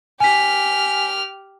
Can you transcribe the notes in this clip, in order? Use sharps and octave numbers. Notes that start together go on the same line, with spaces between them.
G4 G#5 F6 B6